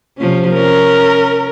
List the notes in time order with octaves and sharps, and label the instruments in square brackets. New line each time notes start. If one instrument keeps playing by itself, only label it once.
[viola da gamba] C3 F3 C#4
[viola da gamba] C#4 [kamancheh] A#4